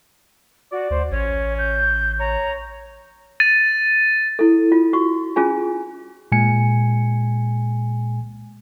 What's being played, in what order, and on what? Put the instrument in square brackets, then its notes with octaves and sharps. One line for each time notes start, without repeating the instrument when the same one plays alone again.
[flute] F#4 [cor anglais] D5
[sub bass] D2 [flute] C5
[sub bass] A1 [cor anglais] C#4 [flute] C#5
[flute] G6
[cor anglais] C#5 [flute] A#5
[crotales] A6 D#7
[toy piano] E4 A4
F4
F#4 C#6
C#4 F4 G#4 G#5
[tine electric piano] A#2 G#3 G#5 C#7